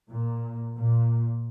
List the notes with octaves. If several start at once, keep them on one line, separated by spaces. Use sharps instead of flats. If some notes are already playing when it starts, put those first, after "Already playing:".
A#2
A#2